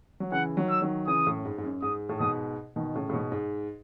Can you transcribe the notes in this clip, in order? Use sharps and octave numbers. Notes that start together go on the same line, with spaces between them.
F#3
C#3 E3 F#5
D#3 F#3
E6
D#3 F#3
C#3 E3 D#6
F#2 A2
G#2
G#2
F#2
G#2 D#6
A2
G#2 B2 D#6
B2 D#3
A2 C#3
A2
G#2 B2
G#2